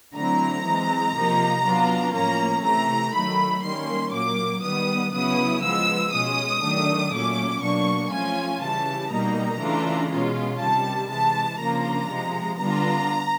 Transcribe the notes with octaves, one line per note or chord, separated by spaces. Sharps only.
D3 F#3 A3 C4 E4 A#5
E3 G#3 C4
C3 F3 A#3 D#4
F#3 B3 D4 F4
A2 F3 A#3 C#4 A#5
C3 E3 A3 A#5
D#3 F#3 A3 B5
D#3 G3 A#3 C#4 C6
A#2 F#3 A#3 D6
D#3 G3 B3 D#6
C#3 F#3 B3 E4 D#6
F3 G#3 B3 E6
B2 G#3 C#4 D#6
D#3 F#3 A3 D4
A#2 F#3 A3 C#4 D6
B2 F#3 A#3 D4 C#6
F3 A3 C#4 F4 G#5
C#3 E3 G3 A5
B2 G3 A#3 D#4 A#5
C#3 E3 A3 D4 F4
B2 G#3 C#4 F4
C3 D#3 G3 A5
C3 E3 G#3 A5
C#3 F3 A#3 D4 F4 A#5
C3 F3 G#3
D3 G3 B3 D4 F4 A#5